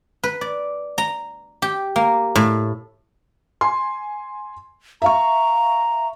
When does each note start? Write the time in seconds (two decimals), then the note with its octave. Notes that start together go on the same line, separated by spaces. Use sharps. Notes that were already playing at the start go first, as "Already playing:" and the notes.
0.23 B4
0.41 D5
0.98 A#5
1.62 G4
1.96 A#3
2.35 A2
3.61 G#5 C6
5.02 E5 F5 A#5 C#6